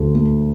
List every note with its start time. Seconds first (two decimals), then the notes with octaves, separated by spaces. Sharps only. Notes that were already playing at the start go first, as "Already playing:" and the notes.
Already playing: D2 A3
0.15 A3